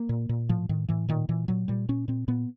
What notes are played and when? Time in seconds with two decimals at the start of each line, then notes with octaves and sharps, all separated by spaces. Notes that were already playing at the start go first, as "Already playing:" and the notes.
Already playing: A#3
0.09 A#2
0.29 A#2
0.49 A2 F3
0.69 A2 D#3
0.89 A2 E3
1.09 A#2 D#3
1.29 A#2 E3
1.48 A#2 F#3
1.68 A#2 G3
1.89 A#2 C#4
2.08 A#2 C4
2.28 A#2 B3